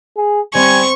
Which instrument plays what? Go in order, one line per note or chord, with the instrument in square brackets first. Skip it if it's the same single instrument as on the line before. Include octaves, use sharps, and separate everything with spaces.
[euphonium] G#4
[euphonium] G3 [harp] C4 [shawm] G#5 [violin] C#6